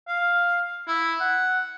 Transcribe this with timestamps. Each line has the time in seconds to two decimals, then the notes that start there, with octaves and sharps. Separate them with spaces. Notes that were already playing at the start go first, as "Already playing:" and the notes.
0.08 F5
0.87 E4
1.20 F#5